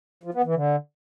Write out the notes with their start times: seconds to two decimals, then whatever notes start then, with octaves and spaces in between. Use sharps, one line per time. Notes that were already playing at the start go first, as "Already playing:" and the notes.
0.24 F3
0.34 B3
0.44 E3
0.55 D3